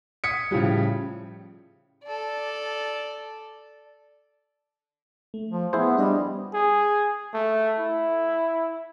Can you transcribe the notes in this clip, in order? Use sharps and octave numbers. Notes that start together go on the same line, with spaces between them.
D#6 G#6 B6 C#7
A2 C#3 F3 G3
A4 D5
A3
F3
B3 E4 G#4 C5
G3 D4 G4 D#5
G#4
A3
E4